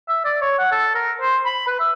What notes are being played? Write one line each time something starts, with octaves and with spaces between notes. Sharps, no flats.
E5
D5
C#5
F#5
A4
A#4
C5
B5
B4
E5